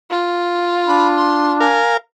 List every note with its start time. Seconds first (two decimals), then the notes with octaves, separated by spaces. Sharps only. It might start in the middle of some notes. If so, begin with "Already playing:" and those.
0.10 F4
0.87 D4 B5
1.17 C6
1.60 A#4 F5 G#5